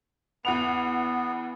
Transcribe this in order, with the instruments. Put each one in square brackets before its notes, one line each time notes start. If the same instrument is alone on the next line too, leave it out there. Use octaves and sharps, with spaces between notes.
[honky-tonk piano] E2 F#5 F7 [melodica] B3